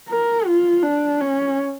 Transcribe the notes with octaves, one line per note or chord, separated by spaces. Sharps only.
A#4
F4
D4
C#4